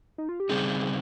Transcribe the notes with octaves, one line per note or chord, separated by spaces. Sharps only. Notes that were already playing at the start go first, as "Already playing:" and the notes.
D#4
F4
G4
C#3 G3 C4 D#4 G#4
G#4